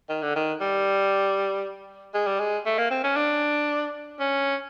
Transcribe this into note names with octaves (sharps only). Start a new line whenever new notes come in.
D#3
D3
D#3
G3
G#3
G3
G#3
A3
A#3
C4
C#4
D4
C#4